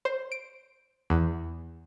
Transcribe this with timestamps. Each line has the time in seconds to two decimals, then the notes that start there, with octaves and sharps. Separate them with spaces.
0.05 C5
0.32 D7
1.10 E2